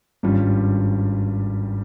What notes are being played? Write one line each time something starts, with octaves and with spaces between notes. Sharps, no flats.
G#1 G2 G3 C#4 F4